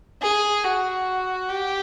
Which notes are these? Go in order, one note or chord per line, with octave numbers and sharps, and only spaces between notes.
G#4
F#4
G4